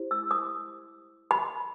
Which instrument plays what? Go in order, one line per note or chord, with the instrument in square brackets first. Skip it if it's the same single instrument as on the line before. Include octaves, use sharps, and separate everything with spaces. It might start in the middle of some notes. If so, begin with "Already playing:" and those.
Already playing: [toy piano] E4 G4 C5
E6
D#6
B5